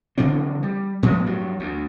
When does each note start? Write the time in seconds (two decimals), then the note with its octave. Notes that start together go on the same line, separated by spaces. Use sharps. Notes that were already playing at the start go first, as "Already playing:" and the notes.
0.18 C#3 E3 F#3 C4
0.63 G3
1.03 A2 F3 G#3 B3
1.26 G2 F#3
1.60 D2